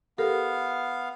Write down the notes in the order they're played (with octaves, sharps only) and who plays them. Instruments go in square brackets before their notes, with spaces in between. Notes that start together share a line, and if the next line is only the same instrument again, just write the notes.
[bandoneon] B3 F5 [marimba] G4 A4 A#4